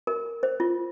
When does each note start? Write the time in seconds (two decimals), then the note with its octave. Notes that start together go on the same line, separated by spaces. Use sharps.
0.07 A#4
0.43 C5
0.60 F4